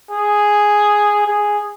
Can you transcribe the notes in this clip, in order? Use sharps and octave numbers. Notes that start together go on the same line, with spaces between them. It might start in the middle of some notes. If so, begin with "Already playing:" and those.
G#4
G#4